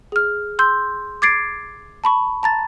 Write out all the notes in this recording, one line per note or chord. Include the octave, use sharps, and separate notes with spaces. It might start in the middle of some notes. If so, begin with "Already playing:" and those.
G#4 F6
C6 E6 G6
D6 G#6 A6 C7 D7
A5 B5 C#6
A5 A#5 A6